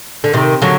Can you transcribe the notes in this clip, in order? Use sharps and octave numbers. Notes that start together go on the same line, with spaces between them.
D3
C3 D#3
D3 F#3